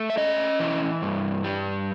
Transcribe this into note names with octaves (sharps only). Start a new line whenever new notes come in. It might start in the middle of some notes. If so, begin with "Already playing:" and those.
Already playing: A3
E5
C#4 D#5
E3
G2
G3